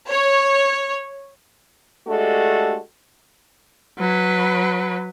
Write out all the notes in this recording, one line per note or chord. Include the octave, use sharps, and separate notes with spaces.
C#5
G#3 A3 D4 F#4 G4 A4
F#3 B4